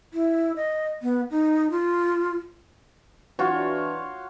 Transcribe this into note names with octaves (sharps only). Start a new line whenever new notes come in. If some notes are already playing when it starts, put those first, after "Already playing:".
E4
D#5
B3
D#4
F4
E3 D4 F4 F#4 C#5